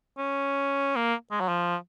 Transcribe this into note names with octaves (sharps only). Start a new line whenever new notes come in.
C#4
A#3
G#3
F#3
F3